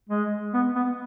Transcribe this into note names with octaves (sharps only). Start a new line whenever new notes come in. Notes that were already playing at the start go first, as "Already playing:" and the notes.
G#3
B3
B3